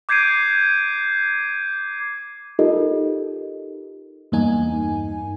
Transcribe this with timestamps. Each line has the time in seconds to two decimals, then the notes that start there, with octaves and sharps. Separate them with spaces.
0.09 D6 G6 G#6 C7 D7 D#7
2.59 D#4 F4 G4 A4 A#4 D#5
4.32 E2 G2 A#3 D#4 G#5